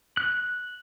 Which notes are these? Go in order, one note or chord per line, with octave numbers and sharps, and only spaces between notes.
F#6